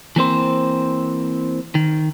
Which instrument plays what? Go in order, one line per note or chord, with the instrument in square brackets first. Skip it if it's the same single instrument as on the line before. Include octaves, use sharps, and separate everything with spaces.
[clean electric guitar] E3 A#3 C4 C5
D#3